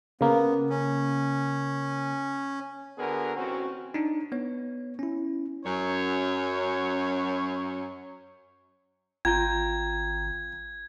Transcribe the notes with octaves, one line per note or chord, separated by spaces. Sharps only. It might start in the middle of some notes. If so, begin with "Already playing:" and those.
C#3 A#3 B3
C#4
D3 B3 F#4 G#4 A#4
A1 C4 C#4 F#4
D4 D#4
B3 C#5
C#4 E4
F#2 C#5
G#1 F4 G5 A#5 G6 G#6